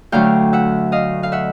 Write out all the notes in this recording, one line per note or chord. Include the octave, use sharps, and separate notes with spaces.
D2 D3 F#3 A3 F5 G5
E5 F#5
D#5 F5
F5
E5 F#5